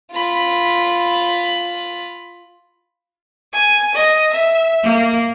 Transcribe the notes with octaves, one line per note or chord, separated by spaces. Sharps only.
F4 B5
G#5
D#5
E5
A#3